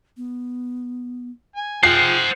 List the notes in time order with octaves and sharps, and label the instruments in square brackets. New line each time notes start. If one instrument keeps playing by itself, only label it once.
[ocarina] B3
[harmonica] G#5
[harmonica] F3 G#4 G5 [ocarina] F4 [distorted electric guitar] C5 F#5 [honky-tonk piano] C7